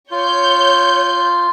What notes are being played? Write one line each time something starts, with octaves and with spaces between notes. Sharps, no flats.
F4 C#5 G6